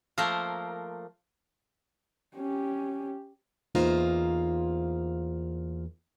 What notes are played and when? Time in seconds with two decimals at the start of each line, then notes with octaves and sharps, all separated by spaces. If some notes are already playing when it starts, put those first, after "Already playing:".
0.18 F3 A3 A#3 A#4 C5
2.36 C#4 G4
3.75 E2 A#3 D#4 F4 C5